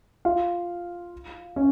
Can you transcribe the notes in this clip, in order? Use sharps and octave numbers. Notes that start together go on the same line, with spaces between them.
F4 F5
C#4 C#5